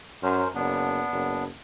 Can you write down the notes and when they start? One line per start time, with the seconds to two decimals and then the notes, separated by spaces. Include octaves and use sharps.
0.23 F#2 C#4 A#4 C5
0.55 F#1 B3 D4
1.12 F#1